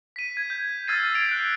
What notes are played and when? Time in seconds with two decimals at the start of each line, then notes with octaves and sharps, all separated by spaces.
0.16 B6 D#7
0.37 G#6
0.50 G6
0.87 E6 F6 G#6 A6 C7 D#7
1.14 A6 C7 D7 F7
1.31 F#6